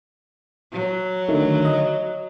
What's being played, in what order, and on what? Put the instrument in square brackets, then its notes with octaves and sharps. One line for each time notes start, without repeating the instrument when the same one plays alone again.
[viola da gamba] F#3
[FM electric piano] D3 D#3 A3
D#5